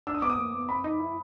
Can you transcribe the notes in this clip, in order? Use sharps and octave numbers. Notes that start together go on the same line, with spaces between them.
D4 E6
D#6
B3 D6
D#6
A#3
B3
C4 B5
D#4
E4